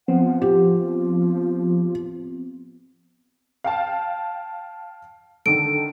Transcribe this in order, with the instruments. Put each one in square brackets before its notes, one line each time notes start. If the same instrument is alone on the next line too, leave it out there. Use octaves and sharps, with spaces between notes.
[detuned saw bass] F3 [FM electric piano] B3 C4 [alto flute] F#5
[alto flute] F4 [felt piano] G4
[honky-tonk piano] F5 G5 A5
[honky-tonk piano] D3 D#3 A4 [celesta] D7